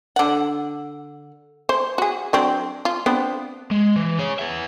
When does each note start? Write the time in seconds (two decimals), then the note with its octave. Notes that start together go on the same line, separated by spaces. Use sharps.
0.16 D3 F#5
1.69 C5
1.98 F#4 G#4
2.33 F#3 C4 D4
2.85 F4
3.06 B3 C4 D4
3.71 G#3
3.96 E3
4.19 G#4 C#5
4.39 B3 E5